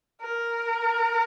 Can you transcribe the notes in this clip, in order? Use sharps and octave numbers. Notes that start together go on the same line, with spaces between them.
A#4